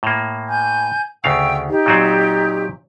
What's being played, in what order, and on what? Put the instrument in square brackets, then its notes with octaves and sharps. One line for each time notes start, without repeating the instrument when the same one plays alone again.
[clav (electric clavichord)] A2 A#3
[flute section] G#5 G6
[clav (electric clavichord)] D2 C#3 F5 [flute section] G5 C#6 E6
[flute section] D#4 G4
[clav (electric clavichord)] A#2 F#3 C4